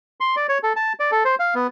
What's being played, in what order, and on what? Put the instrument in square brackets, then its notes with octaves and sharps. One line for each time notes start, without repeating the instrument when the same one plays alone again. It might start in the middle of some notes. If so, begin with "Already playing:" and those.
[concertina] C6
D5
C#5
A4
A5
D5
A4
C5
F5
B3